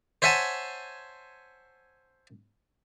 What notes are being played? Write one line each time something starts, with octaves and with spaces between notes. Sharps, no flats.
C5 C#5 E5 F#5 G#5 A5